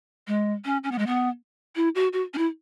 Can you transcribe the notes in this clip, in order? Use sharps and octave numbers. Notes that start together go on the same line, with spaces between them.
G#3
C#4
C#4
B3
G#3
B3
E4
F#4
F#4
C#4
E4